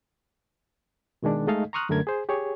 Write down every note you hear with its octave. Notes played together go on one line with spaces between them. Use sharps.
B2 D#3 G#3 D4
G#3 A3 D#4 A4 D#5 F5
A#5 C6 C#6 D#6 F6 F#6
F#2 D3 A3 A#4 G#6
G#4 C5
G4 G#4 C#5